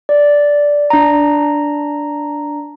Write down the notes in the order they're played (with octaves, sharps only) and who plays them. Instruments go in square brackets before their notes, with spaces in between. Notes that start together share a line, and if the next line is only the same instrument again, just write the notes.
[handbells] D5
D4 A#5